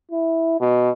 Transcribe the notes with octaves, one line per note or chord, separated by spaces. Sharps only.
E4
B2